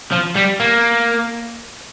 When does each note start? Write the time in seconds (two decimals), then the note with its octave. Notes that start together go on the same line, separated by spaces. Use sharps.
0.12 F3
0.36 G3
0.60 A#3